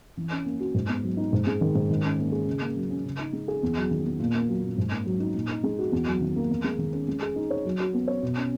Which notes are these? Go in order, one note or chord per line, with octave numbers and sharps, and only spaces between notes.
E3
C#4
A#3
F#4
G#2
B3
F#3
D#4
G#2
G#3
D#3
G#2
D#3
C#4
A#3
G#4
C#3
A#3
F#3
C#4
C#3
D#4
G#3
G#4
E2
F#3
D#3
B3
A#2
A#3
F#3
A#2
G#2
A#3
F#3
D#4
A#2
D#4
G#3
F#4
E2
F#3
D#3
A#3
E2
G#3
D#3
C#4
G#3
G#4
D#4
C#5
F#3
F#4
B3
C#5
B2
C#4